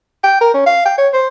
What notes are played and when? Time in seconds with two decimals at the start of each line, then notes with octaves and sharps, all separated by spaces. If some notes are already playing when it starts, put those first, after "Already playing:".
0.23 G5
0.41 A#4
0.54 C#4
0.66 F5
0.85 G5
0.98 C#5
1.13 C5